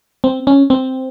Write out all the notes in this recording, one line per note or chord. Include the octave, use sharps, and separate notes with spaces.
C4
C#4
C4